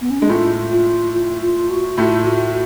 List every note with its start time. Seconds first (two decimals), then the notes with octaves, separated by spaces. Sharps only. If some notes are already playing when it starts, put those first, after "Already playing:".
0.01 B3
0.10 C#4
0.20 G#3 D4
0.29 A2 A3 F4
0.72 F4
1.13 F4
1.42 F4
1.70 F#4
1.97 A2 A3 F4
2.26 F#4